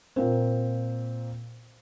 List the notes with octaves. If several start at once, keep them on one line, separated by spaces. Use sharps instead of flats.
A#2 A#3 C4